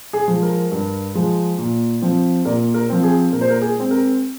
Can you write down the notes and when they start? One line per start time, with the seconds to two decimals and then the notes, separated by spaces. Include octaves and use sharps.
0.13 G#4
0.28 F3 G#3
0.43 A#4
0.72 G2
1.15 F3 G#3
1.58 A#2
2.02 F3 C4
2.45 A#2 A#4 D5
2.74 A#4
2.89 F3 C4
3.03 G#4
3.32 A#2 A#4
3.41 C5
3.50 A#4
3.62 G#4
3.76 G#3 C4
3.91 A#4